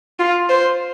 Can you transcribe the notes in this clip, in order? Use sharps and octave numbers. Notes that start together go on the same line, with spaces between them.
F4
C5